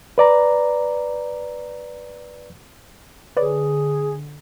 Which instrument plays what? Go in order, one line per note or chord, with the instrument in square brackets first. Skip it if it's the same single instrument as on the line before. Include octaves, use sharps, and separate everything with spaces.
[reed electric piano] B4 D5 A#5
[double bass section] D3 [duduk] G#4 [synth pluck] B4 C#5 D5